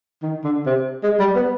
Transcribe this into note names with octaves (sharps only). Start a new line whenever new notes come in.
D#3
D3
C3
G#3
G3
B3